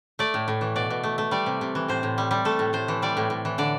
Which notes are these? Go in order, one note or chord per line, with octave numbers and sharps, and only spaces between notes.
A3 D5
A2
A2
E3
B2 D5
B2
A3
A3
G3 D5
C3
C3
E3
A2 C5
A2
G3
G3
A3 A4
A2
A2 C5
E3
G3 D5
A2
A2
E3
D3 D5